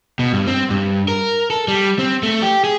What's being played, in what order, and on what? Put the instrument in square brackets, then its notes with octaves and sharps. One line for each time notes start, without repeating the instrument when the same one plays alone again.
[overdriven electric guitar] B2
G2
C4
G2
A#4
A4
G3
C4
A3
G4
G#4